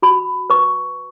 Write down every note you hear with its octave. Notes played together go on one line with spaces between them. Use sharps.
F#4 B5
B4 C#6